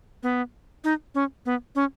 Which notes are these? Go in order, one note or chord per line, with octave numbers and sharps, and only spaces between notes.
B3
D#4
C#4
B3
C#4